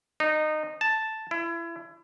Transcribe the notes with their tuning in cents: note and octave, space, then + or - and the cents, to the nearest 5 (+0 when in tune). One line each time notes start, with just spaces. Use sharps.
D#4 -20
A5 +0
E4 +30